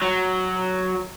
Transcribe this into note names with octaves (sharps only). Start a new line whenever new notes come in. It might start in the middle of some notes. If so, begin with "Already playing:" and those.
F#3